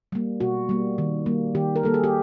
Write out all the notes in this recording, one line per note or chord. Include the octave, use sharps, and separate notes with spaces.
G3 A#3
B2 F#4
G3 A#3
D#3
G3 A#3
D#3 G4
A#4
G3 A#3 A4
G#4
G4